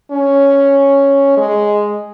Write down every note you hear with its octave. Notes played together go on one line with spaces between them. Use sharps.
C#4
G#3